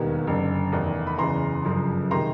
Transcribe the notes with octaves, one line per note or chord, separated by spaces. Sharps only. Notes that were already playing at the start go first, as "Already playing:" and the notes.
Already playing: E1 D#2 D#3 G3 B3 G#5 A#5
F#1 F#2 D3
F1 E2 C3 D#3
B5
F#1 E2 C#3 E3 A#5 C6
G1 F#2 C#3 F3
C3 D#3 G#3 A#5 C6